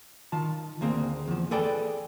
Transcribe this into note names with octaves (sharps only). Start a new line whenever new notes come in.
D#3 F4 A5
D2 A#3 C4 G#4
E2 F3
G#4 A4 B4 D5 G5